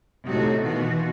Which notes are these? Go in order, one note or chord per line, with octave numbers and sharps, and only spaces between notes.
A2 C3 D#4 F#4 A4
B2 D#3 E3 F4 F#4